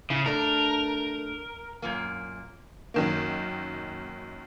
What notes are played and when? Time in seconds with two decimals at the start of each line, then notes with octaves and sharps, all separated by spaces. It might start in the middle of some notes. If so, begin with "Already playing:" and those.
0.10 C#3 E4
0.26 A3 D4 A#4
1.82 F#2 A#2 A#3
2.94 F#2 D#3 A#3